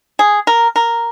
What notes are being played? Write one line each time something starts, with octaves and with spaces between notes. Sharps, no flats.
G#4
A#4
A#4